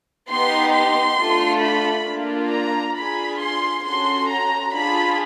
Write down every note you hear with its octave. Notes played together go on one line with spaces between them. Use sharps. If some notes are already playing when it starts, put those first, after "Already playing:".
B3 D#4 G4 C6
C6
A3 D4 F4 A4
B5
A#3 D4 F4
A#5
D4 F4 G#4 B5
C6
C#4 F#4 A4 C6
A#5
D4 F4 G#4 B5